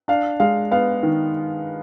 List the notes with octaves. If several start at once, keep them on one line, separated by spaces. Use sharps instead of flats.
D4 F5
G#3 F5
B3 F5
D#3